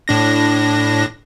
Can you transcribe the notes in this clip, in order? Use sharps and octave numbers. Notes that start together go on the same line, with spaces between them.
A2 D4 A#6